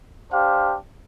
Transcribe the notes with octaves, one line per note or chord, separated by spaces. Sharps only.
D4 G4 C5 F5